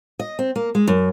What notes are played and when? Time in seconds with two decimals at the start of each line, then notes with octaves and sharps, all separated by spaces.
0.19 D#5
0.39 C4
0.56 A#3
0.75 G#3
0.87 F#2